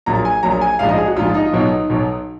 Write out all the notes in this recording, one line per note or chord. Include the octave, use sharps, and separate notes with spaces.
A#1 A#2 F#3 A#5
G#5
A#1 A#2 F#3 A#5
G#5
A#1 G#2 F3 F5
D#5
G#4
F#4
A#1 G#2 F3 F4
D#4
F4
B1 B2 F#3 D#4
B1 B2 F#3